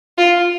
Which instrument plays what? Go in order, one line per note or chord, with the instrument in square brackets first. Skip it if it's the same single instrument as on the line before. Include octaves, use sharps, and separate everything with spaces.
[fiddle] F4